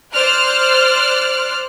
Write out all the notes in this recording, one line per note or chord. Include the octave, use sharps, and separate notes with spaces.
C5 D5 F6 F#6